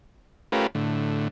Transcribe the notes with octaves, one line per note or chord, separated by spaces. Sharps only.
A3 C#4 F4 G4 A#4 B4
A2 D3